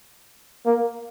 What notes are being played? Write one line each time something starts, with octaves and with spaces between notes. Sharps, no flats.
A#3